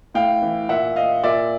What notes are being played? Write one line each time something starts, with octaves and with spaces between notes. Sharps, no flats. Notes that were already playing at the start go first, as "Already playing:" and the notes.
A2 F5 G5
E3
A#2 E5 F#5
D#5 F5
A#2 D5 E5